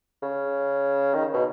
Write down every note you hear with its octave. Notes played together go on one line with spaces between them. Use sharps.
C#3
D#3
B2